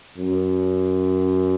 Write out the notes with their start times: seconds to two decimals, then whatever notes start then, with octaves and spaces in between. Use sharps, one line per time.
0.17 F#2